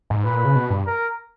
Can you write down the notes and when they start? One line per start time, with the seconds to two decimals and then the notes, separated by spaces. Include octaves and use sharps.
0.10 G#2
0.24 A#2 B4
0.45 C#3
0.56 B2
0.70 G2
0.86 A#4